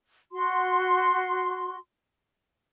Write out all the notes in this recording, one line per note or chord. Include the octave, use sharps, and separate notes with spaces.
F#4 C6